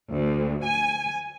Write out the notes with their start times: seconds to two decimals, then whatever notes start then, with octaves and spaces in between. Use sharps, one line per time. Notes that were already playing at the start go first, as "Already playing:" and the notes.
0.12 D2
0.65 G#5